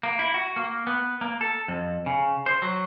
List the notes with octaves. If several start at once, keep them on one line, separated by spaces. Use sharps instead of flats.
A#3
E4
F#4
A#3
B3
A#3
A4
F2
C#3
C5
F#3